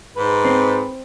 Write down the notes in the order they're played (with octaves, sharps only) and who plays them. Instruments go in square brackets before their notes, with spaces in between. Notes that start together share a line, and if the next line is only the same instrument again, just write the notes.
[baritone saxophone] G#2 [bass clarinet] B4
[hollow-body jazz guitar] C4